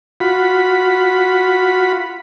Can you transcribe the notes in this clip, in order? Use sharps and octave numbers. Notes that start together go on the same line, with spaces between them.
F4 F#4 B5